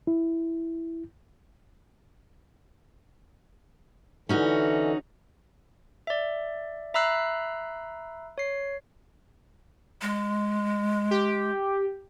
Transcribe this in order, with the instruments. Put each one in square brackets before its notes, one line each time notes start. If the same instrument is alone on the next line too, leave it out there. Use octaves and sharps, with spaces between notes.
[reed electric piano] E4
[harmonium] D3 E3 [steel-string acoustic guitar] C#4 D#4 F#4
[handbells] D5 E5
E5 A#5 B5 E6 F#6 C7
C#5 C7
[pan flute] G#3
[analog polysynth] G4